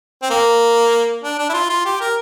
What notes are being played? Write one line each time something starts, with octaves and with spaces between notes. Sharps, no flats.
C4
A#3
D4
D4
E4
F4
F4
G4
A#4